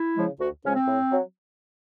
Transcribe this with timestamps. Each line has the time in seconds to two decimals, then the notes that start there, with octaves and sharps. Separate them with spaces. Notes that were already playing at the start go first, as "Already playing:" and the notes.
Already playing: E4
0.15 C#3 F3 G#3
0.39 D2 F#4
0.64 C#3 F3 G#3 C#4
0.75 C4
0.87 A2
1.11 F#3